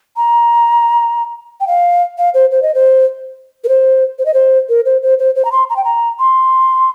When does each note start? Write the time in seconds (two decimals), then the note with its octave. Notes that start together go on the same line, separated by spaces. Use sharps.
0.17 A#5
1.60 G5
1.67 F5
2.18 F5
2.34 C5
2.51 C5
2.62 D#5
2.74 C5
3.64 A#4
3.68 C5
4.19 C5
4.26 D#5
4.34 C5
4.69 A#4
4.85 C5
5.03 C5
5.19 C5
5.36 C5
5.45 A#5
5.52 C6
5.70 A#5
5.76 G5
5.84 A#5
6.19 C6